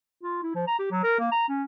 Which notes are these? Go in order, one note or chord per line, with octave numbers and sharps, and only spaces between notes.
F4
E4
F3
A#5
G4
F#3
A#4
A#3
A#5
C#4